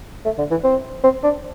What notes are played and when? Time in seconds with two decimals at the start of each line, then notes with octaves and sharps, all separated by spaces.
0.25 A3
0.38 D3
0.51 E3
0.64 C4
1.04 C4
1.23 D4